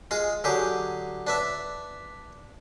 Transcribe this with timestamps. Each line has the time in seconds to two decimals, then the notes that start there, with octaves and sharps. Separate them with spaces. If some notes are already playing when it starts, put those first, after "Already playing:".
0.11 G#3 F4 G#4
0.44 D3 F#3 G4 G#4
1.27 D4 B4 E5